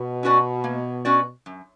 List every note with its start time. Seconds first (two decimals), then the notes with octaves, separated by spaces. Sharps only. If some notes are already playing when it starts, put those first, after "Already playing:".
Already playing: B2
0.23 C#4 F#4 B4 D5
0.64 A#3
1.05 C#4 F#4 B4 D5
1.46 F#2